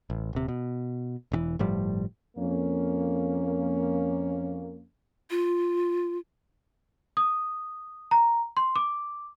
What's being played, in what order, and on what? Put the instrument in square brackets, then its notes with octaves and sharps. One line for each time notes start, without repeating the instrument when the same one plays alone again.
[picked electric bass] A1
D#1 C3
B2
E1 C3 E3
G1 A2 F3 G3
[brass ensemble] F2 A#3 C#4
[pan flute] F4
[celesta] D#6
A#5
C6
D6